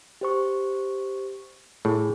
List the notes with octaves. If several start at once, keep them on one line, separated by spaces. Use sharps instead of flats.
G4 C5 C#6
A2 G#4